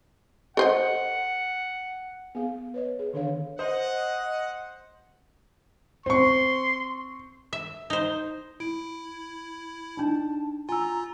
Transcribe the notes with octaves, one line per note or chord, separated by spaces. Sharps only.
A4 C5 D#5 F#5
B3 G#4 F5
B4 C#5 D#5
G#4
D3 D#3 D4 A4 C#5 F5
C5 D#5 F#5
C4 C6 C#6
E5
D#4 C5
E4 D7
D4 D#4 A5
F4 G#5 A#5 E6